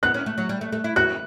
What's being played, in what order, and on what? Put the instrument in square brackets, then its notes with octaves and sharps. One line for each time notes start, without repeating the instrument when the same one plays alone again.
[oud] B3 [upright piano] F#6
[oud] C#4
A3
F#3
G3
A3
A3
E4
[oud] F#4 [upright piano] F#6